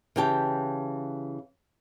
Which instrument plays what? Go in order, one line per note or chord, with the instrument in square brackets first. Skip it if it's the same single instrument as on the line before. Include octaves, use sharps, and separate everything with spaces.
[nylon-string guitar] C#3 E3 G4 G5 A5